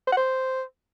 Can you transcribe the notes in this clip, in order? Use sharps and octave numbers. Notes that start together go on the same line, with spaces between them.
C5
F#5
C5